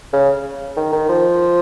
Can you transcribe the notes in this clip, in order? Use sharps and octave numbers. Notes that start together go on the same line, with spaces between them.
C#3
D#3
D#3
F3